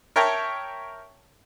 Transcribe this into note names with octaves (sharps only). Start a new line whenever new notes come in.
A#4 C#5 E5 G5 A5 A#5